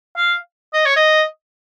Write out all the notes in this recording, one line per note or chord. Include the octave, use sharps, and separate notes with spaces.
F5
D#5
C#5
D#5